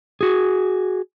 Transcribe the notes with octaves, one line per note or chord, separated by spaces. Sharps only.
F#4 G#4